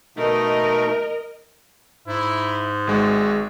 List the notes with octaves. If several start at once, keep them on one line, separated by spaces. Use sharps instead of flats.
B2 A3 D#4 A#4 D#5
G#2 E4
G#1 G#3 F#4